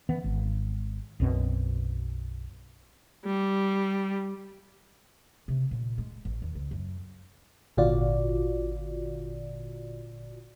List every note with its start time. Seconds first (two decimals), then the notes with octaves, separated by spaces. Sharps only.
0.09 E3 B3
0.24 G#1
1.20 B1 F#2 B2 C4
3.26 G3
5.48 C3
5.71 A#2
5.98 G#3
6.25 A1
6.42 D#2
6.55 C#2
6.71 F#2
7.77 G#1 A#2 D3 F4 F#4 D5